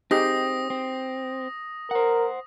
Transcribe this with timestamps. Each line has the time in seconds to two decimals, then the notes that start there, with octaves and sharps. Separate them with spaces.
0.11 C4 D#4 G4 G#4 D#6 A#6
0.70 C4
1.91 A#4 C5 F#5